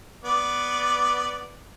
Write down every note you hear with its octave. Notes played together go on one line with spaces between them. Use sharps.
B3 D5